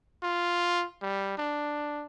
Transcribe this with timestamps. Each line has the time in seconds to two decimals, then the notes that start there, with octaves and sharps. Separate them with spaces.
0.23 F4
1.02 G3
1.37 D4